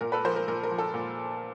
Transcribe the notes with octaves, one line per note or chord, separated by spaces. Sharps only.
A#2 A#4
A4 B4
F3 A#4 C5
A#4
A#2 A#4
A#4
F3
A4
A#2